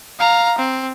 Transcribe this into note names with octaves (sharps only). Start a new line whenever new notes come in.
F5 A#5
C4